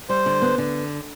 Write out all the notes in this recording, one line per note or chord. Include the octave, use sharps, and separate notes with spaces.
G3 C5
D3
B3
D3